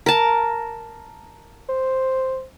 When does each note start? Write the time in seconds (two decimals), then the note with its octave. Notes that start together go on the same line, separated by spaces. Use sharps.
0.06 A#4 A5
1.69 C5